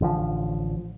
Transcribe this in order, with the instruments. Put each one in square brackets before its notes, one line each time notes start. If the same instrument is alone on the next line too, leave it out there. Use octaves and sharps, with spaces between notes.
[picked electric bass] A1 D3 E3 F3